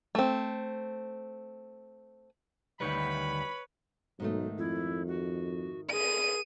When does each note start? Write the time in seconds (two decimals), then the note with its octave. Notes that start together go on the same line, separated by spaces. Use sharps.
0.15 A3 C4
2.80 D2 D#3 G3 B4 C#5 B5
4.20 B1 G#2 D#3 A3
4.58 F2 E4
5.08 F#4
5.92 G#4 D#7